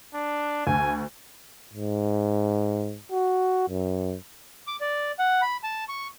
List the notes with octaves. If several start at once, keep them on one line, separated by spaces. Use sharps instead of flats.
D4
D2 G#5
G#2
F#4
F#2
D6
D5
F#5
B5
A5
C#6